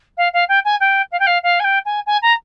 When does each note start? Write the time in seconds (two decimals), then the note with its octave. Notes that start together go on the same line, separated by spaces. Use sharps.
0.17 F5
0.33 F5
0.48 G5
0.64 G#5
0.80 G5
1.11 F5
1.19 G5
1.26 F5
1.43 F5
1.59 G#5
1.64 G5
1.85 G#5
2.06 G#5
2.22 A#5